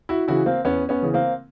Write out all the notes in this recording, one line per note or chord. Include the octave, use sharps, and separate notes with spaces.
E4 F#4
C#3 E3 E4 F#4
A#3 C4
E2 B3 C#4
B3 C#4
C#3 E3
A#3 C4